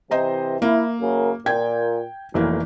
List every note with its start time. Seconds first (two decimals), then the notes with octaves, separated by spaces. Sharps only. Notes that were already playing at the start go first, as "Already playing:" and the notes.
0.11 C3 E3 C5 D#5 A#5
0.62 A#3 E4
1.01 F#2 C#3 A#4
1.46 A#2 G5 G#6
2.34 F1 B1 E3 A#3